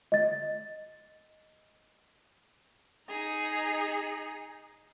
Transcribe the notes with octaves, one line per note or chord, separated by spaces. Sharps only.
D#5 A6
D#4 G#4